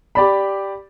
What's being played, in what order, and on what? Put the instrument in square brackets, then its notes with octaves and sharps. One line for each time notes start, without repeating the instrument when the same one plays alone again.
[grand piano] G4 D5 B5